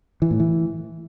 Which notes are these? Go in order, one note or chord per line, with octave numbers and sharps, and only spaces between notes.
E3
A2
E3